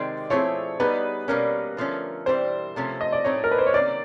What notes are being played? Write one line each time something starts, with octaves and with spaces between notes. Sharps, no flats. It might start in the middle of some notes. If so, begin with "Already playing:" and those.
Already playing: C3 D#3 G#3 C4 D5
F3 A3 C4 E4 G#4 C#5
G3 B3 D#4 G#4 B4
B2 G3 A#3 C#4 A#4
D3 F3 A3 C#4
E3 G3 C4 C5
C3 F3 A3 C#4
D#5
D5
A2 F#3 A3 C4 D#4 C#5
A#4
B4
C5
C#5
C3 D#3 F#3 A#3 C#4 D5